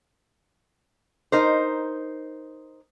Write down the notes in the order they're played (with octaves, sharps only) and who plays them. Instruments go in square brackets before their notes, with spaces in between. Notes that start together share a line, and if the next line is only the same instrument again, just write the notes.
[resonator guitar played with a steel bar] D#4 A#4 C5